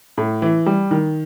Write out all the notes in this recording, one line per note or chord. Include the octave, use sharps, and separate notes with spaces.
A2
E3
G3
D#3